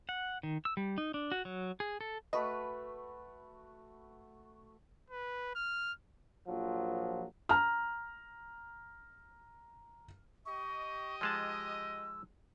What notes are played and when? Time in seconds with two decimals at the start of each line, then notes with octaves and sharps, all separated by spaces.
0.09 F#5
0.43 D#3
0.65 E6
0.77 G3
0.98 D#4
1.14 D4
1.32 F#4
1.45 F#3
1.80 G#4
2.01 A4
2.33 A3 F#4 B4 D#5 B5
5.10 B4
5.55 F6
6.46 A#1 F3 F#3
7.49 A#5 F6
10.46 G4 D#5 C#6
11.21 F3 G#3 A5 E6